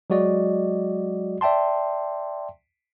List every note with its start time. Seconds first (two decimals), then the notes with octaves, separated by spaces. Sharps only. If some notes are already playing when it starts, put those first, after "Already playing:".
0.10 F#3 G#3 F#4 D5 D#5
1.41 D5 E5 G5 A5 C6